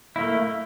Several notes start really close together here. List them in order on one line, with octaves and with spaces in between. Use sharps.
E4 A#3 A3